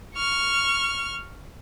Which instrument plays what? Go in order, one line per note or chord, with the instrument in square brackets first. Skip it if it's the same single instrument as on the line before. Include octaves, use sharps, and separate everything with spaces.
[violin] C#6 F6